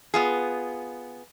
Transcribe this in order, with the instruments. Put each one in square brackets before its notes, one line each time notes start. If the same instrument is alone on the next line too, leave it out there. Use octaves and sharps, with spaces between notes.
[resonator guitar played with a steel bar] B3 F4 G#4